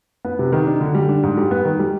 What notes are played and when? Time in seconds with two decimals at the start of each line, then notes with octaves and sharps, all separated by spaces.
0.25 B3
0.39 C3
0.52 D#3
0.66 D4
0.81 D3
0.95 G3
1.09 D4
1.23 G#2
1.37 G3
1.51 B3
1.65 D#3
1.79 G3